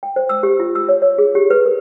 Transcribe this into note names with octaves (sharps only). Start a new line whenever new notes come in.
G5
C5
E6
G4
F4
E6
C#5
C#5
G#4
G4
B4
A#4